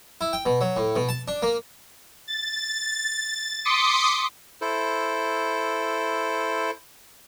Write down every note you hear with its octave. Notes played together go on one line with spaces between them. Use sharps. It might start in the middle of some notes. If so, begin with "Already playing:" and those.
E4
G5
B2
F#3
A2
B2
A5
D4
A#3
A6
C6 D6 D#6 B6 C#7
E4 A4 C5